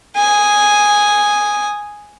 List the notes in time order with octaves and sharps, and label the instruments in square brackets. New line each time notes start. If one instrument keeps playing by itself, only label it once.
[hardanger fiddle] G#5 D#6